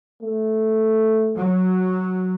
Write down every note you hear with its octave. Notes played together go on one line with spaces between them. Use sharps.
A3
F#3